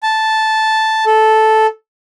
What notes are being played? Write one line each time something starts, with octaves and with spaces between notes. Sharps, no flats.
A5
A4